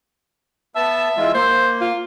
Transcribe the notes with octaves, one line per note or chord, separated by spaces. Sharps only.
B3 E5 A5
E3 G#3 F4
A#3 C5
F4